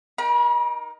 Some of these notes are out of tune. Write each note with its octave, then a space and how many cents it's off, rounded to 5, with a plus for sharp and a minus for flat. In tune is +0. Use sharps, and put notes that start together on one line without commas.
D#4 +0 A#4 +25 B5 -40